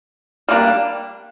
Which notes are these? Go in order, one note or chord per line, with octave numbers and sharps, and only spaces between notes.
G3 A#3 D4